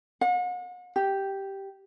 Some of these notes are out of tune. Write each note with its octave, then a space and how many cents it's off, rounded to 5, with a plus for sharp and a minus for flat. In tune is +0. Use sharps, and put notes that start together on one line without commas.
F#5 -40
G4 -5